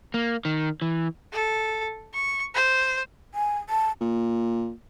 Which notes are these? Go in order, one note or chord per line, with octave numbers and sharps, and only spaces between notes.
A#3
D#3
E3
A4
C#6
C5
G#5
A5
A#2